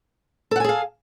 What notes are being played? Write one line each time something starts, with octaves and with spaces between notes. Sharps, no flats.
G#4 A4 F5 F#5 G#5